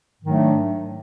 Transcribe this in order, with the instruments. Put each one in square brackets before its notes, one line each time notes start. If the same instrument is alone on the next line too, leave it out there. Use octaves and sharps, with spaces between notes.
[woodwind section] G#2 D#3 F#3 A3 D4